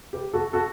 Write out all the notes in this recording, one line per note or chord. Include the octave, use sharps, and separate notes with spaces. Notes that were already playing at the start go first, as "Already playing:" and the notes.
G4 B4
F#4 A4
F#4 A4